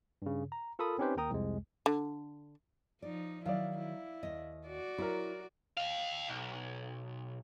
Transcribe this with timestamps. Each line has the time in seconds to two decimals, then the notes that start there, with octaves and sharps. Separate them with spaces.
0.22 G2 C#3
0.52 A#5
0.79 F4 A4 A#4 B5 D#6
0.98 C4 C#4 D#4 G4 B4 C5
1.17 D#2 A#4 G5 A#5 D#6
1.30 C2 F2 C3 G#3
1.86 D3
3.02 F3 D#4 D5
3.46 D#3 F#3 E4 D5 F5
3.78 E4
4.23 D#2 D#5
4.68 F#4 D5
4.98 F#3 E4 A#4
5.77 D#5 F5
6.29 B1